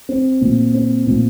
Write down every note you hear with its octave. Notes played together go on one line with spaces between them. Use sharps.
C4
A#2
C4
A#2